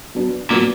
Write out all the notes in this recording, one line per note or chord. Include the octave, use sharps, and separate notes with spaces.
F#3 B3 D4
A#2 F#3 B3 D4